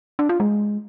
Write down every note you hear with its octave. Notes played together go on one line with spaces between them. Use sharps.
D4
F4
G#3